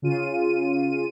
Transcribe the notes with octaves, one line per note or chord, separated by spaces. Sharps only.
C#3 F4 D#7